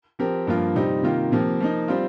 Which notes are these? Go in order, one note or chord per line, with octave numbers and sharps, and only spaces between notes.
F3 C4 G4 A#4
G2 F3 A#3 F4
C3 G3 C4 D#4
C3 D#3 A#3 F4
C3 F3 A#3
F3 A#3 D#4
G3 C4 F4